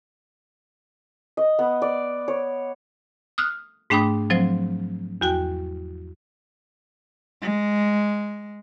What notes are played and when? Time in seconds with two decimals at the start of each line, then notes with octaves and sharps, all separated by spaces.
1.37 D#5
1.59 B3
1.82 D5
2.28 C#5
3.38 D#6 F6 F#6
3.90 G#2 A3 D4 G5 B5 D#6
4.30 F3 F#3 C4 C5
5.21 E2 F#4 G5
7.41 G#3